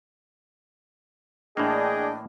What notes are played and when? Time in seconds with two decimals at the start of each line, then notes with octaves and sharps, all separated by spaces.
1.57 A2 E3 A#3 D4 G#4 D#5 G5